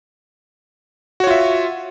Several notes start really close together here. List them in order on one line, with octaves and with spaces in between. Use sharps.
F#4 C#5 F4 E5